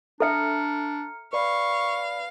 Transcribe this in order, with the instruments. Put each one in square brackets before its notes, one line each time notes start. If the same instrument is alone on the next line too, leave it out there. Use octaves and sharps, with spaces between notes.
[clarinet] D4 [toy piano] A4 E5 [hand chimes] A#5 F6 C#7
[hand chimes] B4 D5 B5 [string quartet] F5 [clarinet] C#6